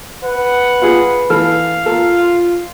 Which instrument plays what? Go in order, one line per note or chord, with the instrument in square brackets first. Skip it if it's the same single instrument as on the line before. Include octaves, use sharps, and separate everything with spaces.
[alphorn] B4 [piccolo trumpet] F#5
[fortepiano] F4 G#4
[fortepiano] E3 A4 F6 [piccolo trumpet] F5
[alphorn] F4 [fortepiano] A4 A#4